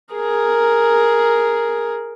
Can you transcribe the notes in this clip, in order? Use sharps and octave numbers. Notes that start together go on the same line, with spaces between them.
G#4 A#4